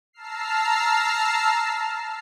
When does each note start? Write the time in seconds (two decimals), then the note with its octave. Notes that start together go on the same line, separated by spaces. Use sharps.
0.13 A5 A#5 E6 F6 C7